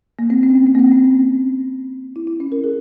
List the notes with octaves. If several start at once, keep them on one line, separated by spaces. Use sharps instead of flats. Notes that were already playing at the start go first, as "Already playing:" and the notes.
A#3
C4
C4
C#4
C4
C4
A#3
C4
C4
C#4
E4
E4
C#4
A#4
G#4